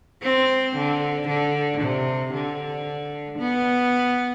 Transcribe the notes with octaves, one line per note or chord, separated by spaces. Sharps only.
C4
D3
D3
C3
D3
B3